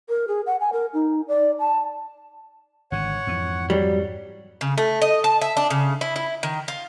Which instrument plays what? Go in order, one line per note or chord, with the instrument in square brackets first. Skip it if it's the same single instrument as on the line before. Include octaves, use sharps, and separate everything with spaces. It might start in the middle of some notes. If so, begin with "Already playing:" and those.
[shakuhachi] A#4
G#4
F#5
G#5
A#4
D#4
D5
A5
[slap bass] G#1 D3 [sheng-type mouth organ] C#5 F#5
[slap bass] F2 G#2 E3
[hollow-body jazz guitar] F#3 G3
[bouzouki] C#3
A3
D#5
A5
E5
D4
C#3
E4
E4
D#3
F4